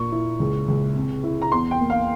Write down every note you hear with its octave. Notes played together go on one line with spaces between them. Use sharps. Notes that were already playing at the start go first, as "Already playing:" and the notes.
Already playing: A#2 A#3 C#6
E4
C#2
C#2
C3
E4
A#5
E2 C6
G5
A#3
F5